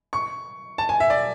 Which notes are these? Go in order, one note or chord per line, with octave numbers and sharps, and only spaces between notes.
C#6
A5
G#5
E5
D5